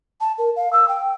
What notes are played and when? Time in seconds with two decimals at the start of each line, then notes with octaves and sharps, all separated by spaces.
0.21 A5
0.38 A#4
0.56 F5
0.73 E6
0.88 G5